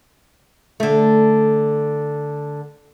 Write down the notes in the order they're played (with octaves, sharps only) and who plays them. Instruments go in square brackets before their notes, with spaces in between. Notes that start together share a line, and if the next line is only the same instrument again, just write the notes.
[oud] D3 A3